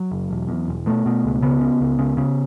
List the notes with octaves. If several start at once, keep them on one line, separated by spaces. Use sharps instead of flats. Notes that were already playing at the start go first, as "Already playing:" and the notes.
Already playing: F#3
F#1
E1
E2
E1
B2 A3
B2
C#2
C#3 B3
C#3
C#2
C#3
C#3